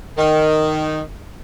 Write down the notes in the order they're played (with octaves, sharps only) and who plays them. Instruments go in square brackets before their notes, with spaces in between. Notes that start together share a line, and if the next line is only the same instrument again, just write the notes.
[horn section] D#3